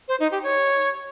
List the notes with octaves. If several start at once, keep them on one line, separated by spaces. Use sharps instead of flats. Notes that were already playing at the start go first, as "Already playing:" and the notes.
C5
D#4
G4
C#5